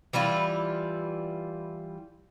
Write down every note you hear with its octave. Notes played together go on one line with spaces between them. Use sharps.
E3 G3 E4 F4